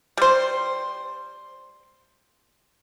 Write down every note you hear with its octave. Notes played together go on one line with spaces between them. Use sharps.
G3 C5